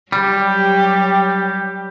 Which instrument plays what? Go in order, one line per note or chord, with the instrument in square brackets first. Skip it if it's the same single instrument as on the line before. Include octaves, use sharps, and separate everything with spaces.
[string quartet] F#3 G4 [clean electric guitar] G3